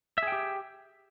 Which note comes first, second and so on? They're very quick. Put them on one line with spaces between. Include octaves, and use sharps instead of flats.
E5 G#4 G5 G4